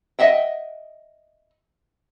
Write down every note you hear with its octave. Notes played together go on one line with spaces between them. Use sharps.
D#5 E5 F#5 G5